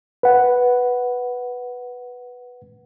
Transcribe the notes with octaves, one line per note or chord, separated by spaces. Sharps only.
B4 F#5